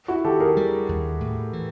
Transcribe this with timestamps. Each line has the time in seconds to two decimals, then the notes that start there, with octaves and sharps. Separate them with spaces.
0.08 E4 F#4
0.25 D#3 G4 A4
0.40 G#4 A#4
0.57 G3
0.89 D#2
1.21 A2
1.53 E3